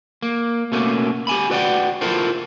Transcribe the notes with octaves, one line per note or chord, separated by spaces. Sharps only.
A#3
B2 A3 A#3 C#4
G4 G#5 B5
F#4 B4 D5 D#5 F#5 G5
E4 F4 A4 A#4 C5